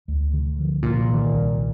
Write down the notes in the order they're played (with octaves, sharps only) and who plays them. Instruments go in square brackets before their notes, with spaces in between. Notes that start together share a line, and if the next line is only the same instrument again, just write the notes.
[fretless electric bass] D2
D3
F3
[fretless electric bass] C2 [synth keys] A#2
[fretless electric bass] D#3
C2